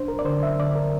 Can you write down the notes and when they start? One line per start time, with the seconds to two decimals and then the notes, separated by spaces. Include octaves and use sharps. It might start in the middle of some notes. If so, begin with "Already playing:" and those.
Already playing: D4 C5
0.08 A#4
0.19 D5
0.25 D3 C5
0.43 E5
0.59 D3 D5
0.75 A#4